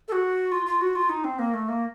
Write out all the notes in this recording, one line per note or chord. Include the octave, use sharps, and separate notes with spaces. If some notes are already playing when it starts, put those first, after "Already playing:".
A4
F#4
F4
F4
F#4
F4
D#4
C4
A#3
A3
A#3